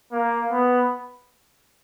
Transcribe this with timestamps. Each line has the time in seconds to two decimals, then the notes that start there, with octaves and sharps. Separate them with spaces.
0.12 A#3
0.52 B3